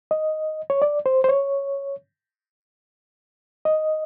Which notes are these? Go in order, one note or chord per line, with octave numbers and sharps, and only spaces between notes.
D#5
C#5
D5
C5
C5
C#5
D#5